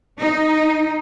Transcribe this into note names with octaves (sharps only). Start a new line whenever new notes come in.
D#4